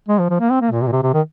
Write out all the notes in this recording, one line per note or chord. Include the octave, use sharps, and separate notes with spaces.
G#3
F3
F3
A#3
C4
A#3
A#2
C3
A#2
C3
C3
D#3